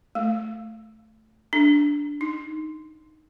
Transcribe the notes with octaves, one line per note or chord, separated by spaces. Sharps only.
A3
D4
D#4